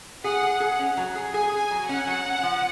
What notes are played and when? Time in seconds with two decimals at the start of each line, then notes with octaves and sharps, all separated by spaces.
0.24 G#4 F#5
0.43 G#4
0.60 G#4
0.79 C#4
0.97 F#3
1.15 G#4
1.34 G#4 G#5
1.52 G#4
1.71 F#3
1.89 C#4 F#5
2.07 F#3
2.25 C#4
2.43 F3